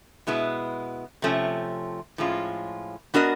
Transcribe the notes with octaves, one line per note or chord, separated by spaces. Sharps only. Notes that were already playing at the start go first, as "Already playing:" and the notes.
B2 G#3 B3 E4
C3 F3 A3 C#4
A2 F3 G#3 C#4 F4
B3 D4 F#4 A#4 D#5